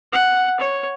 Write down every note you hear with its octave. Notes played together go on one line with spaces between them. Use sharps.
F#5
C#5